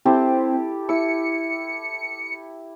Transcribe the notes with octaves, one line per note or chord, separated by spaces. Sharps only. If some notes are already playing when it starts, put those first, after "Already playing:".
C4 E4 G4 A4
E4 D6 E6 C#7